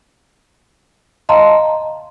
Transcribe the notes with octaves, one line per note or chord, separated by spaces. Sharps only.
D#5 F5 A5 A#5 C6